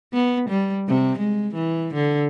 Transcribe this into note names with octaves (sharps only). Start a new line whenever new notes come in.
B3
G3
C3
G#3
E3
D3